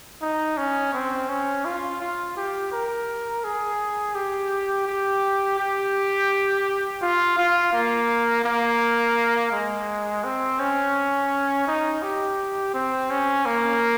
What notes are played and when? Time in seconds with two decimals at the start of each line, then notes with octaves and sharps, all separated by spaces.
0.22 D#4
0.58 C#4
0.94 C4
1.29 C#4
1.65 F4
2.01 F4
2.37 G4
2.72 A#4
3.44 G#4
4.15 G4
4.87 G4
5.59 G4
7.02 F4
7.38 F4
7.73 A#3
8.45 A#3
9.52 G#3
10.24 C4
10.60 C#4
11.67 D#4
12.03 G4
12.74 C4
13.10 C#4
13.46 A#3